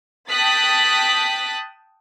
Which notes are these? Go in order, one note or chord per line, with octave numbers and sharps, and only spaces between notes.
G5 A5 D#6 F#6 A6 B6